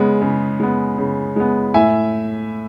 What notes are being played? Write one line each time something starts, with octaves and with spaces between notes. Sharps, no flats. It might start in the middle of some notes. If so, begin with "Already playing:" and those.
Already playing: C#3 G#3 B3
C#3
G#3 B3
C#3
G#3 B3
A2 E5 G#5